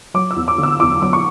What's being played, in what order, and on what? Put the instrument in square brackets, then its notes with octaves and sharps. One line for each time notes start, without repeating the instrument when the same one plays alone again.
[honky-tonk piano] F#3 D6
E6
E2
D6
D3
E6
E2 D6
F#3 D6
C#6